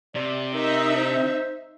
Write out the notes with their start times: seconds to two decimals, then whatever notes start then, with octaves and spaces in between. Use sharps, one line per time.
0.15 C3 D5
0.54 D#4 A#4 E5
0.96 C5